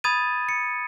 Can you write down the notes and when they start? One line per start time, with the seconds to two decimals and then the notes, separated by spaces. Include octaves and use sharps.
0.04 B5 D#6 G#6 A6 D#7
0.49 C#7